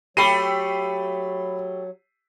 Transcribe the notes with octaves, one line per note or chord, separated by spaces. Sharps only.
F#3 A3 G4 B5 C7 D#7